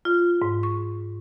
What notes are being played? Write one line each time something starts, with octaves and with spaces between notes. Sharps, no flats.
F4
G#2
C#6